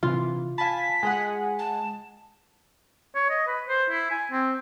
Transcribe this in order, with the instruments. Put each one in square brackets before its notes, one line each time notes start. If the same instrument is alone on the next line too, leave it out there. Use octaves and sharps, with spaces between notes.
[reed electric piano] C3 [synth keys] E3 [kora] F4
[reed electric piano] F5 B5 [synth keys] G#5 A5 [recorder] B6
[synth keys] G#3 G#4 F#5 [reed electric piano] G#5
[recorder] A5
[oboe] C#5
D#5
B4
C5
E4
G#5
C4